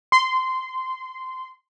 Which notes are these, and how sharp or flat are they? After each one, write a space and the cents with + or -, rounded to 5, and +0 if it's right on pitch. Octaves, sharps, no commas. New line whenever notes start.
C6 -15